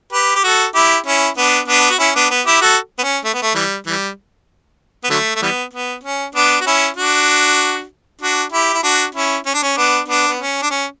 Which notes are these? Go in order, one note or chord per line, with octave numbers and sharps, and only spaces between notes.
G4 B4
G4
F#4 A4
E4 G4
C#4 E4
B3 D4
B3 D4
F#4
C#4 E4
B3 D4
B3
E4 G4
F#4 A4
B3
C#4
A3
B3
A3
E3 G3
E3 G3
B3
D3 F#3 A3
A3
E3 G3 B3
B3
C#4
B3 D4
F#4
C#4 E4
D4 F#4
D4 F#4
E4 G4
E4
D4 F#4
C#4 E4
C#4
D4
C#4
B3 D4
B3 D4
B3
C#4
D4
C#4